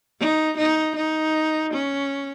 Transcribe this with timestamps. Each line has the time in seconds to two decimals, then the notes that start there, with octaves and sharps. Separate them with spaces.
0.20 D#4
0.58 D#4
0.96 D#4
1.74 C#4